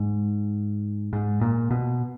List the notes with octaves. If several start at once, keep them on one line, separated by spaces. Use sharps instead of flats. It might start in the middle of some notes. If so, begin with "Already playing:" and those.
Already playing: G#2
G#2
A#2
B2